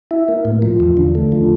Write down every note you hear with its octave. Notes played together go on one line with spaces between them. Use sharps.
E4
A#3
A2
F3
E2
D3
A3
F3